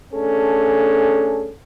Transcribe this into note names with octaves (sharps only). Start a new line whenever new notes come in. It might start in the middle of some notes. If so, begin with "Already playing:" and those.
A3 C#4 D4 G#4 A4